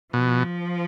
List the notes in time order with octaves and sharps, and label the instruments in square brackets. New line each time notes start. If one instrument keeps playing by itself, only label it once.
[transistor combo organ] B2 [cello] F3